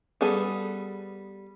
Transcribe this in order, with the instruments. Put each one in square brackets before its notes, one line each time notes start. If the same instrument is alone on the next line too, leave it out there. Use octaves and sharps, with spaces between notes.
[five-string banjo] G3 B3 G#4 A4